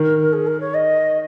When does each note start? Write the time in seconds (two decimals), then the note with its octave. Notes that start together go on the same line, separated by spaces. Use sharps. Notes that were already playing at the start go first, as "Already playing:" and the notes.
Already playing: D#3 A#4
0.33 G#4
0.47 A#4
0.60 C#5
0.74 D#5